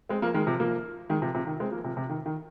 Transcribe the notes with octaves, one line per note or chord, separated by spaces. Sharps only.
G#3 C4
F3 A#3
D#3 G#3
C3 F3
F3 A#3
D#3 G#3
C3 F3
C3 F3
D#3
G#3 C4
F3 A#3
C3 F3
C3
D#3
D#3